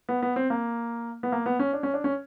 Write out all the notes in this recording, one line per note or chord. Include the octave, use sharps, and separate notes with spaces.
B3
B3
C4
A#3
B3
A#3
B3
C#4
D4
C#4
D4
C#4